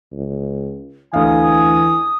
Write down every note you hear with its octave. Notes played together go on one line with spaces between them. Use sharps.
C#2
D2 E3 D#5 F5 G#5 D#6